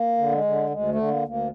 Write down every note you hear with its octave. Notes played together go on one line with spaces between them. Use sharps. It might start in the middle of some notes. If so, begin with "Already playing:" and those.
Already playing: A#3
D3
G#3
D3
D2 G#3
A3
D3
A#3
D2
A#3